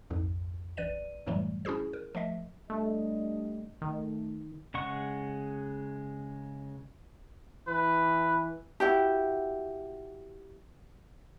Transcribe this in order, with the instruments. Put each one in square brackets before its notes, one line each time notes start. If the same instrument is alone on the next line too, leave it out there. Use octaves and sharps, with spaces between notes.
[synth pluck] A#1 F2 G#2
A1 B4 D5 D#7
F#2 A2 E3 F#3 G3 A3
C#4 E4 F#4 G#4 C5
A#4
F3 A3 D#5 E5
[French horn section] G3 D4 D#5 [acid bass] A3
[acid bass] D#3 [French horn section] A3
[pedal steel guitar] C#3 G#3 F#5 C#6
[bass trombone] E3 [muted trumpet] B4
[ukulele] E4 F#4 G4